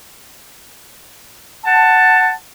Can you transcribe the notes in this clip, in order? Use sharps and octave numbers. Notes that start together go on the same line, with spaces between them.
F#5 A5